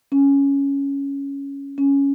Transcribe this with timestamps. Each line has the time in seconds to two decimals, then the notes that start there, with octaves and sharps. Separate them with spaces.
0.12 C#4
1.78 C#4